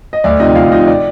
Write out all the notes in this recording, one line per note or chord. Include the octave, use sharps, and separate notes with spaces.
D#5
D2 D5
C3 F3 D#4 D#5
D2 F4 F5
C3 F3 D#4 D#5
D5